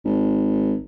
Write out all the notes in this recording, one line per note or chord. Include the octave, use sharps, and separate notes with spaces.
G#1